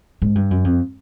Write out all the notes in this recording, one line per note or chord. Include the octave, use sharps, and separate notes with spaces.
G#2
G2
F#2
F2